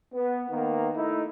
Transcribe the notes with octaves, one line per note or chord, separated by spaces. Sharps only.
B3
D#3 A#3 B3
A3 D#4 E4